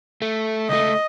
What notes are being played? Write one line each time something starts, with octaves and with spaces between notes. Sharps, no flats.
A3
C#2 A3 D#5